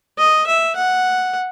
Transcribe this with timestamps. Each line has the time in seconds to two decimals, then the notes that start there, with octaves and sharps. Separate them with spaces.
0.18 D#5
0.47 E5
0.76 F#5